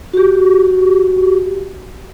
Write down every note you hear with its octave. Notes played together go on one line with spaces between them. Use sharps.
F#4 G4